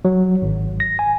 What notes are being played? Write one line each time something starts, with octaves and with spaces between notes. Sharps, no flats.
F#3
G#1
A#6
G#5